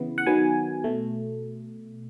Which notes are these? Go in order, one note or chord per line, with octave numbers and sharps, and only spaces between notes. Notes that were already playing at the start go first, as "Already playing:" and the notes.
Already playing: C#3 E3 B3
F#5
D#3 F#3 B3 G#5
B2 A3